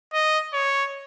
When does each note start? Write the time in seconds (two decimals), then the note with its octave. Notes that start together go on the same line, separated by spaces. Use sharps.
0.13 D#5
0.53 C#5